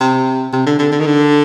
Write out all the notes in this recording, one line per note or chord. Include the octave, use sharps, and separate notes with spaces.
C3
C3
D3
D3
D3
D#3
D3